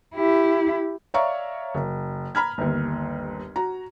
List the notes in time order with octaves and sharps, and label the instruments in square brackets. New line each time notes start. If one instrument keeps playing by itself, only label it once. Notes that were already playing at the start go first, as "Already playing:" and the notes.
[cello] E4 G4
[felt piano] C#5 D5 E5 F5 A#5 C#6
F#1
A#5 B5 F6 G#6
G1 D#2
F#4 A#5